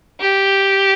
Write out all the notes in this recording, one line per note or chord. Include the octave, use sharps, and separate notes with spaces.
G4